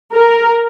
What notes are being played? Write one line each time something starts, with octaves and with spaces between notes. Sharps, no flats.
A#4